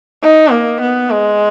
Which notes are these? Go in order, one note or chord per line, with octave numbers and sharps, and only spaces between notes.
D#4
A#3
B3
G#3